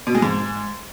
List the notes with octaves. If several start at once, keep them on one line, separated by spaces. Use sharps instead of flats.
B2
G#3
G#2